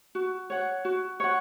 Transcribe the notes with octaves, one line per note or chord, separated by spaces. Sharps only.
F#4
C#5 F#5
F#4
C#5 F#5